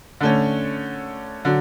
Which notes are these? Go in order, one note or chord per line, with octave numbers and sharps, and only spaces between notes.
D3 A3 C#4
D3 F#3